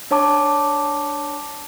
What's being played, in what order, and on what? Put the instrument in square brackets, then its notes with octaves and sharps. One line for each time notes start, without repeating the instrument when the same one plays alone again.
[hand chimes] D4 C#5 A5 D6